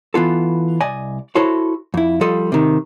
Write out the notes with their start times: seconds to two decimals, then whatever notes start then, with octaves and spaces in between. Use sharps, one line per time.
0.14 E3 B3 F4 A4
0.81 C2 D5 D#5 G#5
1.35 E4 F#4 A4 C5 C#5
1.94 F2 E4
2.21 F3 G3 F4 A4 D#5
2.52 C3 D#3